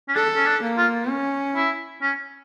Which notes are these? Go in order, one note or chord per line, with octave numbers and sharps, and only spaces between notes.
C#4
D4 A4
C#4
D4
A#3
F4
C#4
E4
C#4